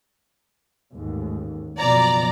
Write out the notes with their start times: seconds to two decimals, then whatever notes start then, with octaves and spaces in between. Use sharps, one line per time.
0.92 A1 D#2 G#2
1.78 F#1 B2 F3 D5 A#5